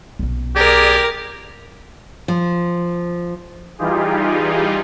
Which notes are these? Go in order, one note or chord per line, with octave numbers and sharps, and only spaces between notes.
B1 C#4
G4 G#4 A#4 D5
F3
E3 G3 D#4 F4 G4 G#4